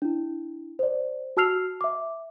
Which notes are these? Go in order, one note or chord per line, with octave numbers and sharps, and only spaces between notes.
D4 E4
C5 D5
F#4 A5 E6 F6 C7 F7
E5 D6